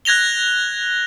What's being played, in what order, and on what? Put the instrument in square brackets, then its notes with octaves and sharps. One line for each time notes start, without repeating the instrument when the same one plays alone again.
[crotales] F#6 G#6 A#6 F7 G7